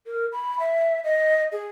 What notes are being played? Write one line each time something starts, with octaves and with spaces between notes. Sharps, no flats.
A#4
B5
E5
D#5
G#4